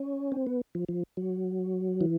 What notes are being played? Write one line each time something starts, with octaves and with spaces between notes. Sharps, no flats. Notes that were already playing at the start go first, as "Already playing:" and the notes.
Already playing: C#4
C4
B3
F3
F3
F#3
E3